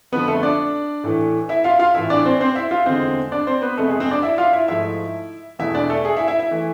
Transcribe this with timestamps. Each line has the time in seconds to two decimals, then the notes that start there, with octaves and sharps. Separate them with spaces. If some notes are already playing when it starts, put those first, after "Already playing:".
0.12 F2 D3 F3 B3 B4
0.28 A3 A4
0.43 D4 D5
1.04 A2 E3 A3
1.49 E4 E5
1.64 F4 F5
1.79 F4 F5
1.95 A2 E3 A3 E4 E5
2.10 D4 D5
2.25 C4 C5
2.41 C4 C5
2.56 E4 E5
2.71 F4 F5
2.86 E2 D3 G#3 C4 C5
3.32 D4 D5
3.47 C4 C5
3.62 B3 B4
3.77 F2 C3 G#3 A3 A4
3.89 G#4
4.00 C4 C5
4.11 D4 D5
4.22 E4 E5
4.38 F4 F5
4.53 E4 E5
4.68 G#2 F3 A3 E4 E5
5.59 E2 B2 A3 E4 E5
5.75 D4 D5
5.89 A3 A4
6.05 G#4
6.17 E4 E5
6.28 E4 E5
6.39 E4 E5
6.51 E3 A3